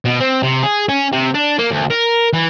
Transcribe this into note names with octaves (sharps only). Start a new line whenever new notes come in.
B2
C4
C3
G#4
C#4
C3
D4
A#3
D2
A#4
E3